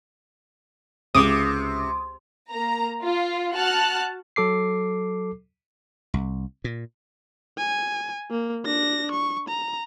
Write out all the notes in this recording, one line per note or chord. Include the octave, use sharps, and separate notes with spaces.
C#2 C3 D6 D#6
A#3 A#5
F4
F#4 A5 F6 F#6
F#3 A4 D6 C7
C2
A#2
G#5
A#3
D4 A#6
C#6
A#5